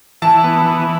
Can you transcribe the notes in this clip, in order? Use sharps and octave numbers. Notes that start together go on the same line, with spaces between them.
E3 A5
B3
E3